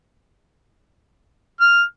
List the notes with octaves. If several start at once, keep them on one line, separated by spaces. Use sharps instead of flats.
F6